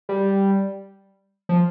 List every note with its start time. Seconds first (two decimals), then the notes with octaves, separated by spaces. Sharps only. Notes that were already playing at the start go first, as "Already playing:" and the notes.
0.09 G3
1.49 F3